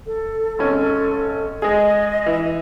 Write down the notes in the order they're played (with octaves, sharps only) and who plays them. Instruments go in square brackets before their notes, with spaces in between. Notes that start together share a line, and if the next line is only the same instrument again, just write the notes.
[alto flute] A4
[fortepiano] G#1 C#4
[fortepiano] G#3 G#4 [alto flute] D#5
[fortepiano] E3